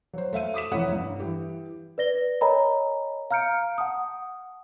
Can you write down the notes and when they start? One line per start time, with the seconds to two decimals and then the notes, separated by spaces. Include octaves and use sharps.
0.13 F#3 C5
0.33 A3 E5 F5 D#7
0.54 D6 D#6 B6 E7
0.72 F1 F2 E3 E4 C#5 F#5
0.92 G2
1.20 E3 G4
1.98 B4 D5 A#6 G7
2.41 A#4 C#5 D#5 G#5 A#5 B5
3.31 F5 A#5 F6 G6 C#7 D7
3.78 F#5 A5 D#6